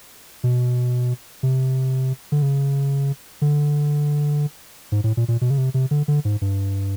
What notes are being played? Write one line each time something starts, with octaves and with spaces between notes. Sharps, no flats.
B2
C3
D3
C#3
D3
G#2
A2
A#2
A#2
B2
C#3
C3
C3
D3
D3
G#2
G2